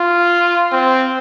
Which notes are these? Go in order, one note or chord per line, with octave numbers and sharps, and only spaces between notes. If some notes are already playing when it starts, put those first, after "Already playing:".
Already playing: F4
C4